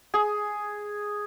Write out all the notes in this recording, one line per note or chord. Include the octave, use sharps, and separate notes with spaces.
G#4